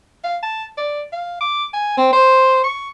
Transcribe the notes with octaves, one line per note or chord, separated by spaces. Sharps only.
F5
A5
D5
F5
D6
G#5
C4
C5
C#6